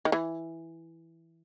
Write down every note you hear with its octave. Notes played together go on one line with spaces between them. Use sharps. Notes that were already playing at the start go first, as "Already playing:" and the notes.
D#3
E3